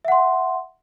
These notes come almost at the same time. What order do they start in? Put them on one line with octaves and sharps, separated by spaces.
E5 F#5 C6